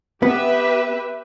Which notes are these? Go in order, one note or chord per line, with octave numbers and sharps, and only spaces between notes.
B3 G4 B4 E5